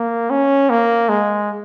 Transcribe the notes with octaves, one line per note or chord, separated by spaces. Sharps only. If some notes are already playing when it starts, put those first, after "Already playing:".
Already playing: A#3
C#4
A#3
G#3